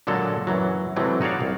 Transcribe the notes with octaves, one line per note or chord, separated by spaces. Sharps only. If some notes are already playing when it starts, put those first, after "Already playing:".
A#2 D3 F#3 G#3 A4
F#2 E3 F#3
C3 E3 F#3 G#3 A3 C4
D#4 F#4 C#5 D5 F5
C2